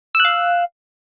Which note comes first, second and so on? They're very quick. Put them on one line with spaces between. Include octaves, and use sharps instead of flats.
E6 F#6 F5